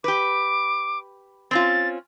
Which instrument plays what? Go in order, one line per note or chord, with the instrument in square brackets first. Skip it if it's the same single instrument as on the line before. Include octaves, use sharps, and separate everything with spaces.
[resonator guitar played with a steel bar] G4 B4 [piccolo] D6
[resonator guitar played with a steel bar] C4 C#4 F4 [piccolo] A6